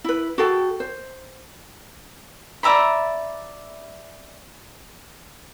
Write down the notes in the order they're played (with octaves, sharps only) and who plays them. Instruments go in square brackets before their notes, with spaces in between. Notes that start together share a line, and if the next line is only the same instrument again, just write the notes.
[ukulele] E4 B4
F#4 G#4 A4 G5
C5
[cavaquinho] D5 E5 A#5 B5